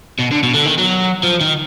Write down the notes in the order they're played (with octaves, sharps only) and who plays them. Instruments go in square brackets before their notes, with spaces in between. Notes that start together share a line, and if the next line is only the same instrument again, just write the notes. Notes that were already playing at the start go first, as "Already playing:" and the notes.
[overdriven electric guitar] B2
D3
B2
D3
D#3
F#3
F3
D#3